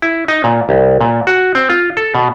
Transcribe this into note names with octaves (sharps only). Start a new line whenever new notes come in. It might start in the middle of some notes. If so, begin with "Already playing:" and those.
E4
D#4
A#2
C2
A#2
F#4
C4
F4
A4
B2